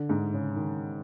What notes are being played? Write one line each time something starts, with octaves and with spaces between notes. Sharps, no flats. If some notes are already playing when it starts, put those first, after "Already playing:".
Already playing: D3
G#2
C#3
D#3